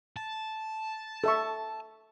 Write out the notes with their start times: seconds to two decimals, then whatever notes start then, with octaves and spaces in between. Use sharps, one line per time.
0.16 A5
1.24 A4 E5 C#6